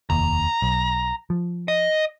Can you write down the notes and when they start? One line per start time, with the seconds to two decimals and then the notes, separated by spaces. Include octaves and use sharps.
0.10 F1 D#2 A#5
0.62 B1
1.30 F3
1.68 D#5